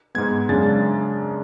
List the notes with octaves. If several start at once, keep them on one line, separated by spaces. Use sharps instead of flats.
G#2 G#3 B3 G#6
F#2 C#3 G#3 D4 A6